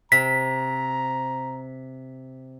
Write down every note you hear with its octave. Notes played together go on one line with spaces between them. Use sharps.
C3 A#5 B6